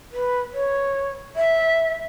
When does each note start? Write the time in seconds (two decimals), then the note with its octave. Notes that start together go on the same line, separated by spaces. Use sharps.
0.12 B4
0.53 C#5
1.36 E5